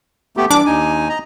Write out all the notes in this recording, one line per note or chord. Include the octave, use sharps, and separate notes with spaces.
A3 B3 G4
E3 G3 D4 D6
D#2 D#4 G#5
D#5 A#5